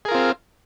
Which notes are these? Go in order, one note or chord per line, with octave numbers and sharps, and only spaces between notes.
C4 F4 G#4 A#4